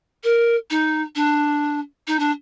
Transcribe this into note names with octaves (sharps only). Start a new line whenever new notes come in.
A#4
D#4
D4
D#4
D4